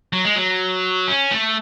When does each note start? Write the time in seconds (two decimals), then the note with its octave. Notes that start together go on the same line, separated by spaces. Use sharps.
0.13 F#3
0.25 G#3
0.36 F#3
1.08 C#4
1.31 A3